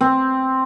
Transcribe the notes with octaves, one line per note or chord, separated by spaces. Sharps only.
C4